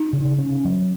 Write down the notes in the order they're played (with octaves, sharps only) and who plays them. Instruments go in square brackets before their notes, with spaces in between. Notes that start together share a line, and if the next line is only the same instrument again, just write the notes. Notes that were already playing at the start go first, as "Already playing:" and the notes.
Already playing: [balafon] D#4
[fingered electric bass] C#3
C#4
F#3